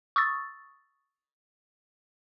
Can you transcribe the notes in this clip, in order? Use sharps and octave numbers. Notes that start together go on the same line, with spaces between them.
C#6 D#6 E6 A6